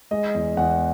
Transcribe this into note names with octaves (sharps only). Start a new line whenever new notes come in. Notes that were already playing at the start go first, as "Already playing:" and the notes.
G#3 D#5
E2
E2 F#5